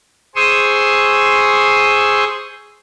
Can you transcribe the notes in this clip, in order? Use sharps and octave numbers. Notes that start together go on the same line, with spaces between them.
G#4 C5 C6 C#6 D#6 E6